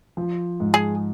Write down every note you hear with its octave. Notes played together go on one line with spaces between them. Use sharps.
F3
G#2
G#4